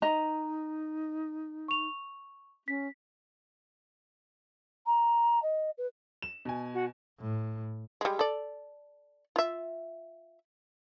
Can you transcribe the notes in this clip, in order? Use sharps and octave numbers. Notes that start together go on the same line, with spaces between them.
D#4 D#5 A#5
C#6 F7
C#4 B6
A#5
D#5
B4
E7
B2 G#5
F#4
A2
G3 G#3
A4 D5
F4 E5